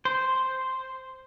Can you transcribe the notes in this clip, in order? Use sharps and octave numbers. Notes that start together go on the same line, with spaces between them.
C5